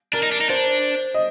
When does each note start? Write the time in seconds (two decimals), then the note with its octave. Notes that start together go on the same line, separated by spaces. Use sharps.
0.13 D4 A#4
0.23 D#4
0.32 D4
0.41 D#4
0.49 D4 C5
1.14 D#5